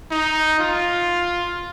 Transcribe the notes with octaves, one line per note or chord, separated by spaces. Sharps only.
D#4
F4